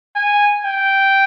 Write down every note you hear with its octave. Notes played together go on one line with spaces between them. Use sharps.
G#5
G5